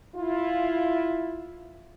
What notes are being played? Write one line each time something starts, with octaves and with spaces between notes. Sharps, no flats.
E4 F4